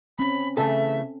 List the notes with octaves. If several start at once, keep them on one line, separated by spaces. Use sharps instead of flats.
C4 C#4 B5
C#3 E3 A3 A4 E5